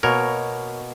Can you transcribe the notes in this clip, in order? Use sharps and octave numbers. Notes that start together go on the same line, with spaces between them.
B2 A#3 A#4 C#5